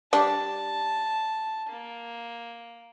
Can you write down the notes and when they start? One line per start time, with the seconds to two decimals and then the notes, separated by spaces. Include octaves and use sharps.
0.13 G3 D4 A5
1.69 A#3